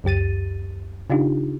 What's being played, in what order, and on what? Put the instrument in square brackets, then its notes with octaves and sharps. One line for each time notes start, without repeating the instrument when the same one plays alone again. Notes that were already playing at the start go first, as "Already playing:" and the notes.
[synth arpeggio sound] C#2 F#2 G4 A6 D#7
C#3 D4 D#4 F4 G4